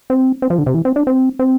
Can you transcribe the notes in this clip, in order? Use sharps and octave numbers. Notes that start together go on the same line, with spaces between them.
C4
C4
F3
D3
C3
E3
C4
D4
C4
C4